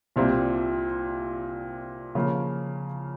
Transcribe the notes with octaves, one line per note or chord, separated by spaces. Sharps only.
C2 A#2 G3 C4
C#3 F3 A#3 F4